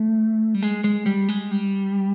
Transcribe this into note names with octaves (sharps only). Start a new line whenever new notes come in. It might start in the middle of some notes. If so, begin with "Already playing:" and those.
Already playing: A3
G3
G#3
G#3
G3
G#3
G3